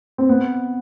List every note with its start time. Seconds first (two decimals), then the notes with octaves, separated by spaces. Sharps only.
0.18 C4
0.29 B3